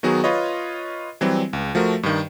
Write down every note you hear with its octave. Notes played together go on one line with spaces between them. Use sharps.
D#3 F#3 B3 F#4 G#4
F4 B4 C#5 D#5
E3 F#3 G3 C4
C#2
F3 A3 F#4 A#4
G2 D#3